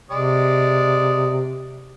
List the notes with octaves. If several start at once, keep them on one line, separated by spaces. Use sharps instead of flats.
C3 G#3 D5 D#6